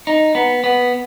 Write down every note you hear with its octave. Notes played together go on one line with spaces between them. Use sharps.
D#4
B3
B3